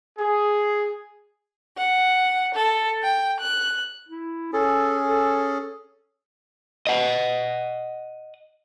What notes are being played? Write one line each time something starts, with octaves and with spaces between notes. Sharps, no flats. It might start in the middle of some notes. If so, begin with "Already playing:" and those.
G#4
F#5
A4
G5
F#6
E4
C#4 G#4 A4
A4
D#5 F#5